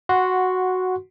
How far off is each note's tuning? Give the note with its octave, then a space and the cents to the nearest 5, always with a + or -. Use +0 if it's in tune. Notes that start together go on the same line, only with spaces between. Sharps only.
F#4 +0 F#5 -10 C6 +0